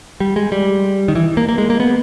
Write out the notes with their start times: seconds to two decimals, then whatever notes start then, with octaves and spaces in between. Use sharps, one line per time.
0.20 G3
0.36 G#3
0.52 G3
1.08 D#3
1.15 E3
1.37 A#3
1.49 A#3
1.58 G#3
1.70 A#3
1.80 B3